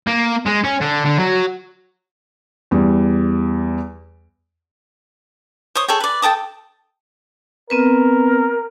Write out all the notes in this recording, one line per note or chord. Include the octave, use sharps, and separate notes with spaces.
A#3
G#3
C#4
D3
D3
F#3
E2 G3
C5 C#5 D#6
G#4 A4 C#5 G5
B4 D5
A4 G5 A5 D#6
B3 C4 A#4 B4